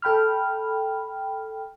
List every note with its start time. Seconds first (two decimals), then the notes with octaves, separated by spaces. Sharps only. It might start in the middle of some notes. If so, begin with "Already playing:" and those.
0.02 A4 G5 B5 F6